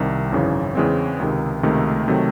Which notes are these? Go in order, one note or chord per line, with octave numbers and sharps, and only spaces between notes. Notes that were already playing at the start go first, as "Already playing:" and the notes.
Already playing: C2 C3 D#3
G#1 F#2 C#3 E3
E2 C#3 E3 G#3 C4
C#2 C3 D#3
C#2 C3 D#3 A3
C3 D#3 F#3 A3